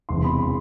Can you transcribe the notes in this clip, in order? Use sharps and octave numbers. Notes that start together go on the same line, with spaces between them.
E1 E2 C3 C6
B5
C6